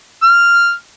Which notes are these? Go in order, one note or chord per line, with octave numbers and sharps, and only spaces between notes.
F6